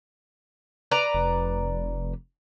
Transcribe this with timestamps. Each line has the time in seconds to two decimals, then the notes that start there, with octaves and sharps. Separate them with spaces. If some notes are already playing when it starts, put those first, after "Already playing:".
0.91 B4 D5 A#5
1.14 F1